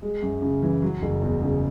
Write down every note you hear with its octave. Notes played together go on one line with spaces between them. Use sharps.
G#3
F#2
C#3
E3
F#3
F#1
E2
C#3